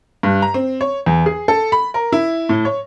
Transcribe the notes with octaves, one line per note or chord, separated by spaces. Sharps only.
G2
A#5
C4
C#5
E2
G#4
A4
B5
A#4
E4
A2
C#5